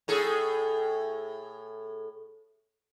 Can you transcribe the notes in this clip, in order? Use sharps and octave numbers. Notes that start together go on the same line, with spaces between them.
A2 G#4 A4